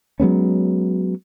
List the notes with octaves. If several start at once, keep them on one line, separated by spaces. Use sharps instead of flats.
F#3 G#3 B3 C#4